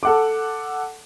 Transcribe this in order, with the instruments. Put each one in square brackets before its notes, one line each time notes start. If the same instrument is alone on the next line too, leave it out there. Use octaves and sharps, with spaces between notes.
[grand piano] A4 F#5 D6